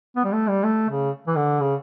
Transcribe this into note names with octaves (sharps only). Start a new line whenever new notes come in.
B3
G3
A3
G3
A3
C#3
E3
D3
C#3